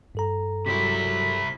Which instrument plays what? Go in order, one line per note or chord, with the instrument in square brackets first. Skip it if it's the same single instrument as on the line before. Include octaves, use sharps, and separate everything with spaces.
[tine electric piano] G2 A4 A#5
[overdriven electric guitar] C3 E4 [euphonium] F#3 [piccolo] B6